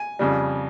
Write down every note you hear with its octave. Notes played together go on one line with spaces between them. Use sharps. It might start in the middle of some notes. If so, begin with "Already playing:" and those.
Already playing: G#5
F2 C#3 G3